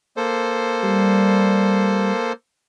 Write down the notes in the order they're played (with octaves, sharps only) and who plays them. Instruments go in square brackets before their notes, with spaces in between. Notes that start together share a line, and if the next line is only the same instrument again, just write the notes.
[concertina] A#3 A4 C5
[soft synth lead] G3